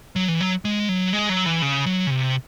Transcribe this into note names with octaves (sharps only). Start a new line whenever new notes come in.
F#3
E3
F#3
G#3
F#3
G#3
F#3
E3
C#3
F#3
C#3
C3